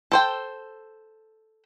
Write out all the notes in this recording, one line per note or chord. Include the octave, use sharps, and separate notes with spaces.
A4 C5 G5